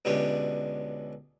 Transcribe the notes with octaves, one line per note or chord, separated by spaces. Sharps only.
C#2 B2 D3 G3 C#4